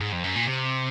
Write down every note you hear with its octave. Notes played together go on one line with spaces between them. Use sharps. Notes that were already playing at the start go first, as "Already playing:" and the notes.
G#2
F2
F#2
A#2
C3